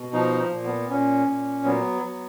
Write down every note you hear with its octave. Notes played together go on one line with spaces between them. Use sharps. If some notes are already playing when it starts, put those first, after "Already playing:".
Already playing: B2
F3 D#4
A#2
B3
A#2 C#4
A#2
F#3 B3
F#3